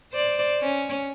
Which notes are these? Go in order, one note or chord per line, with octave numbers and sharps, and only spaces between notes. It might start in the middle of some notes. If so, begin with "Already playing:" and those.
C5 D5
C#4